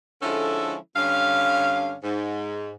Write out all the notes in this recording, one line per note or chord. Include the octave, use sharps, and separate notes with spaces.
D3 F3 G#3 C#4 E4 A4
G2 D3 C#4 F5
G#2